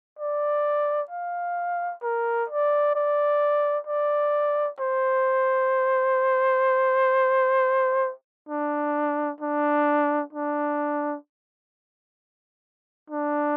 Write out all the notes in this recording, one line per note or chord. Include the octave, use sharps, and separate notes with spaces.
D5
F5
A#4
D5
D5
D5
C5
D4
D4
D4
D4